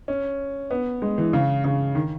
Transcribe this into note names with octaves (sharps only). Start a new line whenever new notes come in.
C#4
B3
G#3
E3
C#3
C#3
D#3